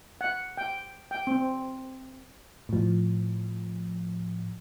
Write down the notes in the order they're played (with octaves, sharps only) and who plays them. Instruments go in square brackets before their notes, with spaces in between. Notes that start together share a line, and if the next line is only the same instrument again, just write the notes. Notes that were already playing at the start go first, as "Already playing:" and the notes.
[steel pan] F#5
G5
G5
C4
[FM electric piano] A2 F3